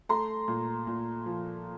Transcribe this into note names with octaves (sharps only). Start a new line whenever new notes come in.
A3 A#5 C6
A#2
A#2
F3